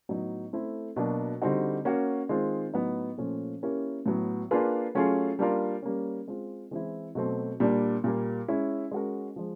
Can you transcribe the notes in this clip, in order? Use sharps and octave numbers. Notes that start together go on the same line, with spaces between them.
A2 F#3 B3 D#4
A3 C4 E4 A4
B2 F#3 A#3 D4
D3 G3 C4 D#4 F#4
A#3 C#4 F#4
D#3 G#3 C4 F4
A2 F#3 B3 D#4
A#2 F3 A3 C#4
A#3 C#4 E4 G4 A#4
A2 F#3 B3
A#3 D4 F4 G#4 B4
F#3 A3 C#4 F4 G#4
G3 A#3 D4 F4 A#4
G3 A#3 C#4
G#3 C4 F4
E3 G#3 C4 E4
B2 F#3 A3 C4
A#2 G3 A#3 D4
A#2 G3 A#3
G#3 C#4 E4
G#3 C#4 F#4 A#4
F3 G#3